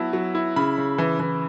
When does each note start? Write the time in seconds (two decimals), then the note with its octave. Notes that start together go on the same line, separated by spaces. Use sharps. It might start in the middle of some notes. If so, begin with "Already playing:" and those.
Already playing: F#3 B3 E4 A5
0.13 F#3
0.35 E4
0.56 C#3 B5
0.78 C#3
0.98 E3
1.19 E3